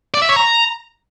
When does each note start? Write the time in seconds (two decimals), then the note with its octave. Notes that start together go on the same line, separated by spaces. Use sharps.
0.14 D5
0.22 E5
0.29 C#5
0.36 A#5